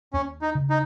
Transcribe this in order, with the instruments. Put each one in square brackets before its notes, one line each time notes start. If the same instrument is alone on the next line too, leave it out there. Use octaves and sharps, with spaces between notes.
[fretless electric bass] D#2 [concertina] C#4
[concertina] D#4
[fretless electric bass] C#3
[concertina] D#4